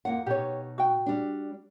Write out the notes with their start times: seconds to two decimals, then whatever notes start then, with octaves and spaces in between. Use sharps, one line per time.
0.05 F2 A#3 F#5
0.26 B2 D#4 G4 C#5
0.78 F#4 G5
1.06 G3 D4